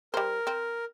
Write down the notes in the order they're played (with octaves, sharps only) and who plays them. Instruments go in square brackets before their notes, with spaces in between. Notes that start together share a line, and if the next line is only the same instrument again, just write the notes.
[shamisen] G3 C5 [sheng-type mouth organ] A#4
[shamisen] C4